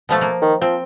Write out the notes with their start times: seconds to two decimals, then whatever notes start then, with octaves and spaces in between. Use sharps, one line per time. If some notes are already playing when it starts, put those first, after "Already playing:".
0.09 B2 F3 A3
0.21 A#3
0.42 D#3
0.62 F3 C4